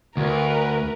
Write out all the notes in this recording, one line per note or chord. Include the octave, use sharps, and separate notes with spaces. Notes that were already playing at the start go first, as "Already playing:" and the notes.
D2 A#4 B4